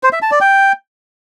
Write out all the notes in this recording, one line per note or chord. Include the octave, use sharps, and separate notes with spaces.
C5
E5
A5
D5
G5